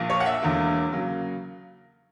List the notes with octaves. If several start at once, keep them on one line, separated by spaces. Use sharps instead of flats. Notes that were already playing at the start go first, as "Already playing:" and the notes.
Already playing: A#1 A#2 A#3
C#5
F#5
E5
E1 E2 D3 A#3
C#3 F#3 A#3